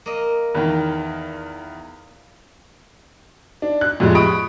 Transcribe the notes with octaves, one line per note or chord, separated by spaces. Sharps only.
A#3 D#5
E2 D#3
D4
F#6
F2 A2 G3 G#3
B5 C#6 D#6 D7